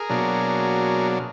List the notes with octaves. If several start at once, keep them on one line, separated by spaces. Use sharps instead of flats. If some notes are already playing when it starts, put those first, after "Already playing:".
Already playing: G#4 A#4
B2 F#3 A#3 D4